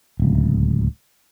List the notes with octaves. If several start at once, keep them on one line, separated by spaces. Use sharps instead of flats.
D1 C#2